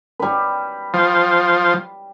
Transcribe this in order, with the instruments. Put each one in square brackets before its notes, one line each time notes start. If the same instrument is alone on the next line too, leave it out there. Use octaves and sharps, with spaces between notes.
[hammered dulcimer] G3 B4
[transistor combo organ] F3